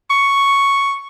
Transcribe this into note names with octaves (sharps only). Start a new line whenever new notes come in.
C#6